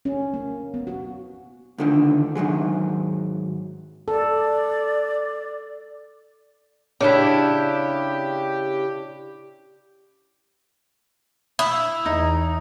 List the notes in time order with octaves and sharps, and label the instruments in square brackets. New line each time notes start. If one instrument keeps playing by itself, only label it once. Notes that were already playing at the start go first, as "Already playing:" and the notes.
[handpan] C#4
A#3
B3
F#4
[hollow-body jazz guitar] C#2 D3 D#3
G#2 D#3 F#3 G#3
[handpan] A4 [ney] D5
[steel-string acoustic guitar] C#3 D4 E4 [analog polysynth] G4
[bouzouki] E4 [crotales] D#6
[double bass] E2 [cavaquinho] D#4